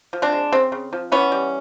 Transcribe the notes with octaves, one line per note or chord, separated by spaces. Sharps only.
F3
C4 D4
G#3
C#3 C4
C#3
F3
E3 B3 C#4
G3